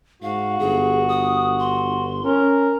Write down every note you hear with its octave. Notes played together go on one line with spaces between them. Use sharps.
G#2 F#4 F5
G1 G#4
D#6
C6
C#4 A#4